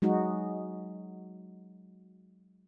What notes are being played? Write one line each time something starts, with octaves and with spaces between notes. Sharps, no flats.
F#3 G#3 D#4 F#4